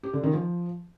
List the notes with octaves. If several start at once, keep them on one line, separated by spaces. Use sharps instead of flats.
G4
D3
D#3
F3